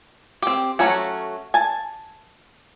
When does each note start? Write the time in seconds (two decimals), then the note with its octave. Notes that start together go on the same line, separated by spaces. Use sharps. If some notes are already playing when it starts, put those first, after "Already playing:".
0.42 C4 G4
0.79 F#3 A3 C#4 F#4
1.54 G#5 A5